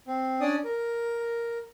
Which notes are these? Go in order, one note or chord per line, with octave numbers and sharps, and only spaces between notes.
C4
C#4 D4 D5 D#6
A#4